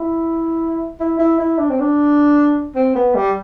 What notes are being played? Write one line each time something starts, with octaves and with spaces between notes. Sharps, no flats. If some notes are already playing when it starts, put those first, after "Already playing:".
Already playing: E4
E4
E4
E4
D4
C4
D4
C4
B3
G3